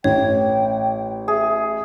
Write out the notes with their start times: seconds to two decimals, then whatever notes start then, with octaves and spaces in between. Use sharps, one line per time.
0.04 A1 C#5 G5
1.28 G#4 E5